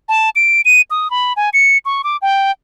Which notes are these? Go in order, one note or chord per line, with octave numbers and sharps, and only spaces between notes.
A5
D7
D#7
D#6
B5
G#5
C#7
C#6
D6
G5